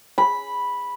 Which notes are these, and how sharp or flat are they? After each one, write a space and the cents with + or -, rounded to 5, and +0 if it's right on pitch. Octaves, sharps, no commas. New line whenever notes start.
B5 -5